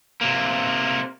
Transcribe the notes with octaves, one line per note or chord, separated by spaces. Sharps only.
C3 A#3